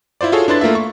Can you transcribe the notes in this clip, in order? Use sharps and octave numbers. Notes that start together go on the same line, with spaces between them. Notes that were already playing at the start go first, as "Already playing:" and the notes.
E4 F4 C5 D5
F4 F#4 G#4 A4 C#5 F5
D4 E4 B4 C6 A6
A3 A#3 F4 E5
C#6